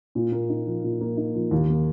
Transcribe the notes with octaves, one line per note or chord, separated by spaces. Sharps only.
A#2
A#3
D#4
F3
A#2
A#3
D#4
F3
D#2
A#3